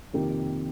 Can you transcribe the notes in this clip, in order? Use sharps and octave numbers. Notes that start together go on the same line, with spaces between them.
F2 C3 D#3 A#3 G4